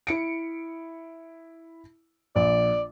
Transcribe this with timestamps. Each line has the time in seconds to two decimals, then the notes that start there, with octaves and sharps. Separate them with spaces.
0.07 E4 C#7 D7
2.36 A#1 D5